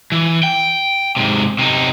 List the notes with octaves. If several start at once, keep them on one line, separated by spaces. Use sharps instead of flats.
E3
G5
G#2 C3
C3 D#4